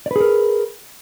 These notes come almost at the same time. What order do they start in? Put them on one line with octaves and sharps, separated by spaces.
D5 B4 G#4 A#4